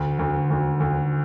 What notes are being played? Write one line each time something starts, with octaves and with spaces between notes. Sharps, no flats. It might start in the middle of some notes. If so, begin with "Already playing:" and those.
Already playing: D2
D2
D2
D2